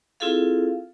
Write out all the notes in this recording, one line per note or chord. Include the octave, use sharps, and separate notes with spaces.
C4 E4 F4 G#4 A4 F5